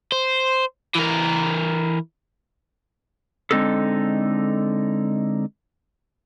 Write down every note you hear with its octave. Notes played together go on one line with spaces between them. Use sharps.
C5
E3 A#4
D3 G#3 C4 D#4 G#4 A4